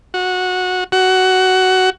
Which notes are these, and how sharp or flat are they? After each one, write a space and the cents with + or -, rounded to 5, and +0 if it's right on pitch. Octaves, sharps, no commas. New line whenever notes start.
F#4 -15
F#4 +15